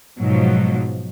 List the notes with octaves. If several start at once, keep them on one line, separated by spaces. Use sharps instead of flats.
G#2 B2 F3 F#3